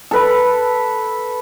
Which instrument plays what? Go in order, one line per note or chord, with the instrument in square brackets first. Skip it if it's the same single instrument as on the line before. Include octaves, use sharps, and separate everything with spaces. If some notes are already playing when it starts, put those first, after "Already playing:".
[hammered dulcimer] A4 B4 B5